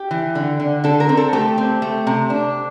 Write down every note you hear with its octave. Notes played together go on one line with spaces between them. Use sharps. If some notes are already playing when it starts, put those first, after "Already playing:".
Already playing: G4
E3
D3
D3
D3 A4
A#4
C4
A4
A3 G4
C4
A3
C3
D4